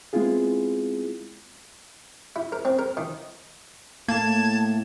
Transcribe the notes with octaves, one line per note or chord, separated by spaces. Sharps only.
G#3 B3 C4 E4 F4 G#4
E4
A#4
C4
A#4
D#3
A2 A#3 A5 G#6